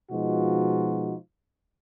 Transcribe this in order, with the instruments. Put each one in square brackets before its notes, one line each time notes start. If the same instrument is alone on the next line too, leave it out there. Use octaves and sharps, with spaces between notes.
[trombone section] B2 F3 G#3 D#4 F4 F#4